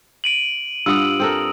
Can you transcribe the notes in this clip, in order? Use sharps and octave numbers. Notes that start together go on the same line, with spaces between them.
D7 D#7 F#7
G2 F4 F#5 D#6 E6
C4 A4 A#4